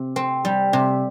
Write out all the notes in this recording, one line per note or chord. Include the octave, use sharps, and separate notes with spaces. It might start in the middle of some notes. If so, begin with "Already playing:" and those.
Already playing: C3
C4
G3
C3